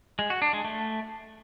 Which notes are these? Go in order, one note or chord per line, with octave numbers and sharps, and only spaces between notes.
G#3
F#4
D4
G#3
A3